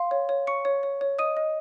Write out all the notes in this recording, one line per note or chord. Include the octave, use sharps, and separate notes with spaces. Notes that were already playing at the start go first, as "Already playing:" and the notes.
Already playing: F5 C6
C#5
C#5
C#5 C#6 C#7
C#5
C#5
C#5
D#5 D#6 D#7
D#5